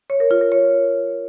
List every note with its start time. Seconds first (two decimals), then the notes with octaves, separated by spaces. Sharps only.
0.10 C#5
0.20 A#4
0.31 F4
0.41 A#4
0.52 C#5